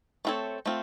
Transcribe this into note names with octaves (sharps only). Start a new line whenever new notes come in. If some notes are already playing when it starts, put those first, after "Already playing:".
A3 C4 F4 A4 C#5
A3 C4 F4